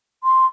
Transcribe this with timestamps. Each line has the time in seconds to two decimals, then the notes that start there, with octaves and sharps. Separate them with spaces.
0.24 C6